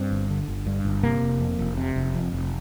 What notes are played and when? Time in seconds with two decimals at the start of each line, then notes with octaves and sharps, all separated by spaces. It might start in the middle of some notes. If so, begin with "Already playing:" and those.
Already playing: G2 C4
0.11 G1
0.30 D3
0.48 G1
0.67 G2
0.85 G1
1.03 C3 A#3
1.22 F1
1.40 F2
1.59 F1
1.78 C3
1.96 F1
2.15 F2
2.33 F1